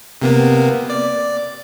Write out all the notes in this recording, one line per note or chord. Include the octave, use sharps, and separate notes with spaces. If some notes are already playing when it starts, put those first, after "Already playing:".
C3 A#3 B3
D5